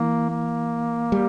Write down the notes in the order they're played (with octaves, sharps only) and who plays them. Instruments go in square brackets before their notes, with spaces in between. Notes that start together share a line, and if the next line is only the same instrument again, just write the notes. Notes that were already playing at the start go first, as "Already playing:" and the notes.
Already playing: [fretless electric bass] E3 [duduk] A#3
[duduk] A#3
[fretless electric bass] G3